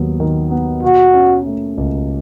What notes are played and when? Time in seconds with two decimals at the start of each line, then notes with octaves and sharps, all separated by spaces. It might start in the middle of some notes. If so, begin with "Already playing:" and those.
Already playing: D#2 F#3 B3
0.20 D#3
0.51 B3
0.83 B2 F#4
1.14 C#4
1.46 A3
1.78 C#2